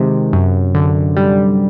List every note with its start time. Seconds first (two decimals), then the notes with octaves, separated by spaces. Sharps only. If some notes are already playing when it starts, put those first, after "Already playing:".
Already playing: C3 D#3 G#3
0.33 F#2
0.75 D3
1.17 G3